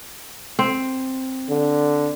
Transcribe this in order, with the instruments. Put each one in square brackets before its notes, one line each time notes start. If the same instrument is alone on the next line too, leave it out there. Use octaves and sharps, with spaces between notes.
[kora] C4
[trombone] D3